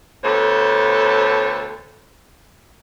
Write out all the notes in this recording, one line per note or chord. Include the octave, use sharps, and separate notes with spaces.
D2 B3 A4 C5 C#5